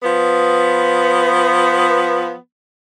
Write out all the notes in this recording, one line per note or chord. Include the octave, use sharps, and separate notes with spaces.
F3 B3